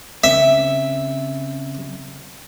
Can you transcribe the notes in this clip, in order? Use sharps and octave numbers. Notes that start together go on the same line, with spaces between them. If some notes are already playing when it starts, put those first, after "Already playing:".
C#3 C4 E5